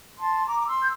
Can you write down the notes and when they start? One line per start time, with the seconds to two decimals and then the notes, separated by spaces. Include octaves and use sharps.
0.19 A5 C6
0.46 A#5 D6
0.59 D6
0.67 C6 E6
0.81 G6